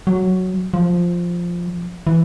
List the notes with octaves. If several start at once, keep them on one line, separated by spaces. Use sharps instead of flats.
F#3
F3
E3